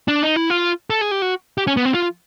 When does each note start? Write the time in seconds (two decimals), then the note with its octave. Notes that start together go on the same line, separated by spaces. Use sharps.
0.08 D4
0.23 D#4
0.36 E4
0.50 F4
0.90 A4
1.01 G#4
1.11 G4
1.22 F#4
1.58 G4
1.67 C#4
1.77 B3
1.85 C4
1.94 F4